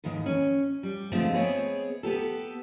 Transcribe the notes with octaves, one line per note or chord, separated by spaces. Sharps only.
D#2 G#2 D#3 E3
C#4
G3
D3 F3 G#3 A3 B3 C4
B3 C4 G#4 C#5
B3 G4 A4